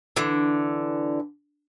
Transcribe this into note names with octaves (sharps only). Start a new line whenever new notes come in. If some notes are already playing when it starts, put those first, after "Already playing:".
D3 E3